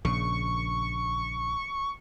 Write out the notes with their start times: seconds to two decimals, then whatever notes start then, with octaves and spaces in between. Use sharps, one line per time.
0.05 A#1 C#3 C#6